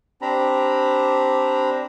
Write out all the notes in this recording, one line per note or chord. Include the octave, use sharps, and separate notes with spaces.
C4 D4 G4 A#5 B5